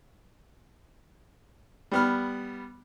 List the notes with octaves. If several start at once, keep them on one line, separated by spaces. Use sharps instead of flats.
G3 B3 F6